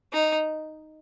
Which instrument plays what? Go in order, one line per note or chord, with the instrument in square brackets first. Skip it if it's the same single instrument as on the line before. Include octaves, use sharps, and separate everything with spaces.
[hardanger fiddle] D#4